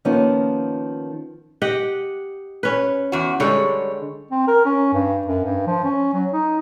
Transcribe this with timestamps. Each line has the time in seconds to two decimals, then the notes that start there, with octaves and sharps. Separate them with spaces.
0.05 D#3 F3 A#3 B3 C#4 D#4
1.62 G4 D#5 F#5
2.63 C#4 B4
3.12 E2 F#4
3.40 D3 G3 G#3 C#5
4.31 C4
4.48 A#4
4.65 C#4
4.93 G2
5.27 F#2
5.44 G2
5.66 F3
5.84 C#4
6.13 F#3
6.33 D#4